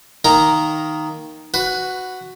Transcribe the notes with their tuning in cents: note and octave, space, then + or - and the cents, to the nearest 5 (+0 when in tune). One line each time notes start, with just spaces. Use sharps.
D#3 +0 A#3 +0 A#5 +0
F#4 +0 B4 +15